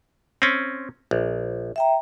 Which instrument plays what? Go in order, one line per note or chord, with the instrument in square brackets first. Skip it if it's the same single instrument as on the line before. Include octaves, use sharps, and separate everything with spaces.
[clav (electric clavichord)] C4 C#4
A#1
[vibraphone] E5 G5 A#5